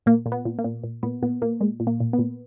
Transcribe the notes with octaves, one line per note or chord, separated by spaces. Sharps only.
A#2 A#3
A#2
B3
A#2
A#3
A#2
A#2
A#2 B3
A#2 B3
A#2 A#3
A#2 G#3
A#2
A#3
A#2
B3
A#2